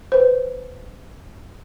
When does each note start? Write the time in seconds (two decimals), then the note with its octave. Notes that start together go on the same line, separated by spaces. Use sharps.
0.12 B4 C5